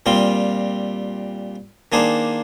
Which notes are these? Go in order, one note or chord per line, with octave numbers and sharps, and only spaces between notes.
A#2 G3 C4 F4
D#3 A#3 D4 G#4 C5